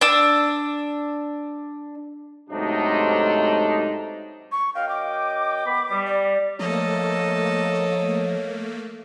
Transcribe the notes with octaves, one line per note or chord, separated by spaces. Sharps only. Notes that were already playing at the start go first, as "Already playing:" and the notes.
D4 E6
G#2 C3 F#3 A3 D4 D#4
C#6
F#2 D#5 F5 G5
D6
B3 B5
G3
D5
F3 A3 A#3 A4 C#5 D#5